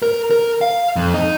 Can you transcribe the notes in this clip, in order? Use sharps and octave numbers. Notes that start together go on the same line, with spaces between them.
A#4
A#4
F5
F2
D#4